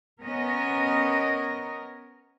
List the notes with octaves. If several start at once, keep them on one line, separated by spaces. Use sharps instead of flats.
B3 C#4 A#4 D#5